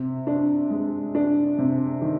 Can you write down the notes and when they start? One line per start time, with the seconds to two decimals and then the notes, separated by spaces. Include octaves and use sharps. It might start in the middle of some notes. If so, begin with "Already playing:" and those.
Already playing: C3
0.27 D4
0.70 G#3
1.15 D4
1.58 C3
2.02 D#3